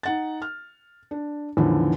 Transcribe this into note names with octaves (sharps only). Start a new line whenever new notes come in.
D#4 F#5 A6
F6
D4
E2 A2 D3 D#3 F3